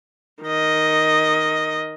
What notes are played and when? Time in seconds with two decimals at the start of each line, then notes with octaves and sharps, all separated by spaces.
0.43 D#3 D#5